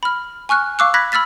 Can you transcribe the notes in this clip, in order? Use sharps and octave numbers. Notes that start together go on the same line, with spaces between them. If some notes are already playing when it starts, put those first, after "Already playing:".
B5 F6
G#5 C#6 F6 F#6
F5 C#6 D6 E6 F#6
B5 F#6 G#6 A#6 B6
B5 E6 F6 A6 B6